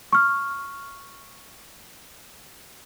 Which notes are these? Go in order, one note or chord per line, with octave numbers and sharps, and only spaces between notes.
C#6 F6